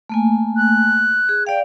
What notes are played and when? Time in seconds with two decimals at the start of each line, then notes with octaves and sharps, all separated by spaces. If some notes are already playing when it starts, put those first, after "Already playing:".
0.09 A3 A#3 G#5
0.57 F#6
1.29 G#4
1.47 D5 F5 G5